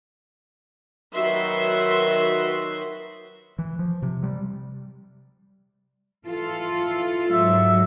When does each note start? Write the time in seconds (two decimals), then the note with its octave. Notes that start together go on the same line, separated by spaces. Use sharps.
1.15 D#3 F#3 F#4 B4 E5 C6
3.59 E3
3.79 F3
4.02 C3
4.23 G3
6.26 E3 F4 A4
7.32 G#2 F#3 E5